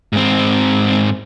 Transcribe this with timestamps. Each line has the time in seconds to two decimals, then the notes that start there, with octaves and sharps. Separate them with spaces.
0.13 G#2 C4